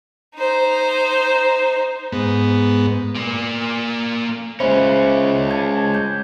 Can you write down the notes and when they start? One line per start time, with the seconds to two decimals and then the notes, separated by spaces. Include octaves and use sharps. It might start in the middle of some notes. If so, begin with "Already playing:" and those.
0.36 D#4 C5
2.12 G#2 B3
3.15 A#3 D5
4.60 G#3 C#4 C5 E5 B5
5.49 A5 G#6
5.94 G6